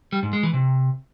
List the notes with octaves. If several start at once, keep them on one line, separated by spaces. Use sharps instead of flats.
G3
G#2
G#3
E3
C3